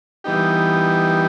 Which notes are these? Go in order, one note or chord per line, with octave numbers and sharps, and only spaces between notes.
E3 G3 B3 D#4 G4